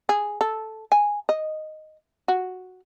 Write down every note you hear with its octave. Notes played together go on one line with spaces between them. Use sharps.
G#4
A4
G#5
D#5
F#4